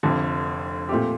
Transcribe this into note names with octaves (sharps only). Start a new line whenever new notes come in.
F1 F2 D3
A#2 A3 C4 G4